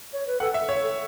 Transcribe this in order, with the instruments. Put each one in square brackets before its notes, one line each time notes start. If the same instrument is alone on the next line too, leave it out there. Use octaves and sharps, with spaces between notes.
[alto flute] C#5
B4
[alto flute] A4 [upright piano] F#5
[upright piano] E5
C#5
[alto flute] A4